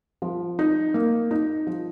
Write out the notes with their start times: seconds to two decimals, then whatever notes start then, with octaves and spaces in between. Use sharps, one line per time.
0.22 F3
0.59 D#4
0.94 A#3
1.31 D#4
1.67 F3